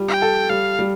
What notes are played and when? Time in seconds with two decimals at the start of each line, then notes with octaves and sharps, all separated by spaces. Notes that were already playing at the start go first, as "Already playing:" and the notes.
Already playing: G3 F4
0.08 G5
0.22 A4
0.50 G3 F5
0.79 G3